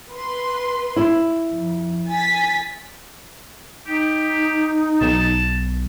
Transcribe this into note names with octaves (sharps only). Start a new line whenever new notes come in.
B4 C6
E4
F2
G#5 A6 B6
D#4 G4
B1 A5